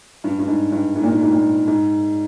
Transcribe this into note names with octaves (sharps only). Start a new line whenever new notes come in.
G2
G2
G#2
G2
G#2
A#2
G#2
G#2
A#2
G#2